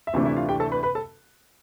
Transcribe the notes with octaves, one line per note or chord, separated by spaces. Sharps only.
E5
D2 C3 E3 A3 D4 F4 F5
E4 E5
F4 F5
G4 G5
A4 A5
B4 B5
B4 B5
A4 A5